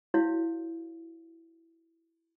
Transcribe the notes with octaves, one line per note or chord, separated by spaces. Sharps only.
E4 F#4 C#5 F5